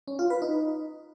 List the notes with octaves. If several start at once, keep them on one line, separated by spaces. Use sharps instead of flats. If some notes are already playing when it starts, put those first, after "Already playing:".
C#4
F4
B4
D#4